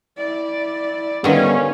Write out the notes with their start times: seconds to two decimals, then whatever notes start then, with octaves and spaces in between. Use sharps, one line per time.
0.18 E4 D5
1.24 D3 D#3 G3 B3 C#4 D#4 F5